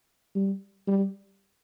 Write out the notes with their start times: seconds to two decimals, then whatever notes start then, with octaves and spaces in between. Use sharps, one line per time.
0.35 G3
0.88 G3